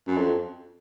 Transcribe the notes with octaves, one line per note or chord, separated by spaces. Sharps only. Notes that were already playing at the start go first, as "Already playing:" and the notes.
F#2
F2